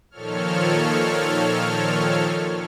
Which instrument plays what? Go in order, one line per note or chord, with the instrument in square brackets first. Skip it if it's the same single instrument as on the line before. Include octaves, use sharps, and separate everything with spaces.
[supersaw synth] A#2 D#3 F3 A4 C#5 F6